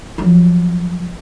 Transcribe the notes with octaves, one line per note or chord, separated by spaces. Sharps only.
F3 F#3